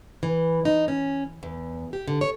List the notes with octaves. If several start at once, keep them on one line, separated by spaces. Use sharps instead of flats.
E3
D#4
C#4
E2
G4
D3
C#5